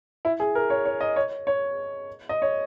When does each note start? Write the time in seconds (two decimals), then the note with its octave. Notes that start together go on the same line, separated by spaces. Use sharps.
0.25 E4
0.40 G#4
0.55 A#4
0.70 C#5
0.85 C#5
1.01 D#5
1.16 C#5
1.47 C#5
2.29 D#5
2.42 C#5